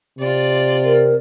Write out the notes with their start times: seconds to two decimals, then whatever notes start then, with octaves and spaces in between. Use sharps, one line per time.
0.19 C3 F4 D5
0.84 A#4